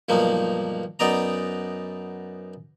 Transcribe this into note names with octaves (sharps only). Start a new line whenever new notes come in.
B1 G2 F3 A#3 D#4
F#2 B3 D#4 D5 D#5 A#5